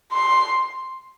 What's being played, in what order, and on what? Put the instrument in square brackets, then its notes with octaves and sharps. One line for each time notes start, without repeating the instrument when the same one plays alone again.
[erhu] C6